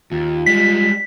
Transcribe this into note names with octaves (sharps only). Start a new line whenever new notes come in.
D#2 F4
G3 G#3 B6